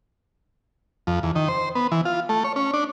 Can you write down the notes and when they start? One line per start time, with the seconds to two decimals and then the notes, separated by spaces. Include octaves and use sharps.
1.07 F2
1.23 E2
1.35 D#3
1.48 C5
1.75 B3
1.92 E3
2.05 F4
2.29 A3
2.44 C#5
2.56 C#4
2.74 D4